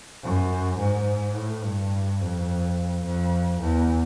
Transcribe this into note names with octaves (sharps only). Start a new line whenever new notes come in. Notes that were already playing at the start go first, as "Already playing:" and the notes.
F#2
G#2
A2
G2
F2
F2
E2